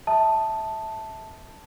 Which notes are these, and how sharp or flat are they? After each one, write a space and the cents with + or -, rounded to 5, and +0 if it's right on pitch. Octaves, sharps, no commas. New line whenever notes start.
E5 -20 A5 +0 D#6 +0